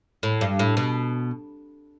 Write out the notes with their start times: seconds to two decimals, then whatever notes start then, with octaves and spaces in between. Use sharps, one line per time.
0.23 A2
0.41 G2
0.59 A2
0.77 B2